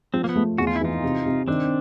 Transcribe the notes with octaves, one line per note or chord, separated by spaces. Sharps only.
F3 C4
A#3
B3
A3
E2 F#4
F4
E4
E3 D#4 F4
C3
C3
D#3 C4 D4